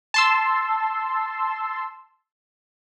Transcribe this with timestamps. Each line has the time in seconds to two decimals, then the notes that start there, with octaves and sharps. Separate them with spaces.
0.14 A5 C6 E6